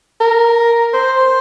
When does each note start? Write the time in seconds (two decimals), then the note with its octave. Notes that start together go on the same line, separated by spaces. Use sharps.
0.20 A#4
0.94 C5